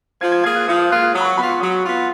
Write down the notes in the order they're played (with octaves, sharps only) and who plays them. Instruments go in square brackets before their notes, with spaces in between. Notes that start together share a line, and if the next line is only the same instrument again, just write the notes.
[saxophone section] F3 [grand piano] G#6
[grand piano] G#6
[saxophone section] A#3 F4 G#4 [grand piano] G#6
[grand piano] F#6
[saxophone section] F3 [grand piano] D#6
[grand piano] D#6
[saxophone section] A#3 F4 G#4 [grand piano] F#6
[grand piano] F#6
[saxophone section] F#3 [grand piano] D#6
[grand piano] B5
C#6
[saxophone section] B3 [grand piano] B5
[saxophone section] F4
[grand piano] C#6
[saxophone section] F#3 [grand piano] D#6
[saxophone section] B3 F4